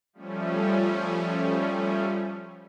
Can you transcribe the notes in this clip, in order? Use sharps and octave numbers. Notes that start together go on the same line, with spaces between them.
F3 G3 A3 C#4